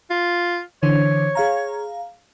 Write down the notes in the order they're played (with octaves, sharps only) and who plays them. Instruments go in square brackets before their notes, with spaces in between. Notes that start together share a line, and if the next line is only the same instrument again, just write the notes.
[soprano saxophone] F4
[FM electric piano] D3 E3 C5 [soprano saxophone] C#5
[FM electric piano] G#4 F5 A#5